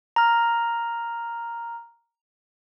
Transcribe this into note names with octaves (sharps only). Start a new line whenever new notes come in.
A#5 F6